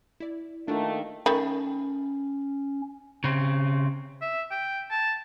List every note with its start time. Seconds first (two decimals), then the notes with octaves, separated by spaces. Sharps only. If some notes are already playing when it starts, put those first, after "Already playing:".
0.20 E4 D5
0.68 D#3 A3 A#3 D4 F4
1.26 D#3 A3 C#4 B5
3.24 C#3 C4
4.22 E5
4.51 G5
4.91 A5